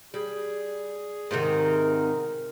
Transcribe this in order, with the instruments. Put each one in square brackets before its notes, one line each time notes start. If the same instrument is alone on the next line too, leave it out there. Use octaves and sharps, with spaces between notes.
[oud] G3 [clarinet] G#4
[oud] G#2 C3 D#3 [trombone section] A#4